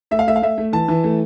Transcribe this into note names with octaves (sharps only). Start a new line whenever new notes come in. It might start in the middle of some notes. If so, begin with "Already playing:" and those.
A3 E5
F5
A3 E5
F5
A3 E5
A3
E3 A5
E3
A3